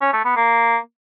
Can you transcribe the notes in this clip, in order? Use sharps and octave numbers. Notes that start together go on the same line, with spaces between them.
C#4
A3
B3
A#3